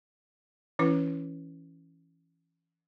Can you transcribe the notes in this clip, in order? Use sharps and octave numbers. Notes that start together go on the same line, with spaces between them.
E3 C#4 E4 B4